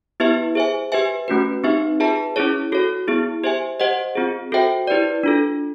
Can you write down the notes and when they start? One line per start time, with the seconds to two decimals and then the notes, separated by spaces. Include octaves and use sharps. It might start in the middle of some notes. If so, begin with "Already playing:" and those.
0.20 B3 E4 G4 B4 E5
0.55 G#4 C5 E5 G#5
0.92 G4 B4 E5 G#5
1.28 A3 C#4 F#4 B4
1.64 C4 D#4 G4 B4 E5
2.00 F4 G#4 B4 E5 A5
2.36 C#4 E4 G#4 C#5
2.72 F#4 A4 C#5
3.08 B3 E4 G#4
3.44 G4 C5 E5 G#5
3.80 G4 C5 D#5 F#5
4.15 C4 F4 G#4
4.52 F#4 A4 C5 E5 G5
4.87 E4 G4 B4 D5
5.23 D4 F4 A4